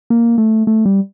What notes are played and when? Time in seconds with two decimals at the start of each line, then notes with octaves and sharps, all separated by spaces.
0.10 A#3
0.38 A3
0.67 A3
0.85 G3